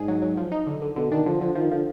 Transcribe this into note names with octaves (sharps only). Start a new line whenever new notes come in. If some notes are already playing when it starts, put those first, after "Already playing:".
Already playing: G#2 D4 G#4
F#3
F#3
F3
D#4
D3
D3
B2 D3
D#3 D4
D3 F3
D3 F3
D#3 F3
D3 F3